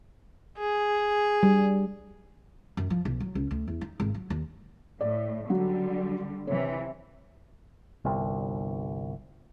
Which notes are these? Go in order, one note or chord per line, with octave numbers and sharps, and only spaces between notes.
G#4
G3
F#2
F3
B1
F#3
C#2
D2
E2
D#4
G#1
F#3
D#2
A2 D5
D3 F#3 G3
C3 E3 C#5
G1 C2